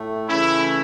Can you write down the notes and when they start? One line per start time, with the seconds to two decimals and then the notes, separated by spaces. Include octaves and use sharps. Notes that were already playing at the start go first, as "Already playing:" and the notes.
Already playing: A2 A3
0.28 C#3 E3 A3 C#4 E4